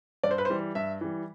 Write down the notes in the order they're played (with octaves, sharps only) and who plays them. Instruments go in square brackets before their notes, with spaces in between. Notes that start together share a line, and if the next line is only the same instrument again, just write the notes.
[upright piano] G2 D5
C5
B4
C5
E3 G3
G2 E5
E3 G3